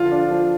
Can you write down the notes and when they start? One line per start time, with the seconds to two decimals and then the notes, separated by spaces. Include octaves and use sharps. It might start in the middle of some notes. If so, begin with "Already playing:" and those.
Already playing: D3 F3 F4
0.12 D4
0.31 F3